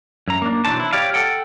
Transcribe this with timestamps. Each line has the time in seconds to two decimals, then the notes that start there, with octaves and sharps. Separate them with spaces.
0.28 F#2 A#5
0.42 A#3 D4
0.65 B1 E3 F#3 D4 C5 A5
0.80 E4
0.93 G4 C#5 D5 F5
1.14 A4 F#5 G5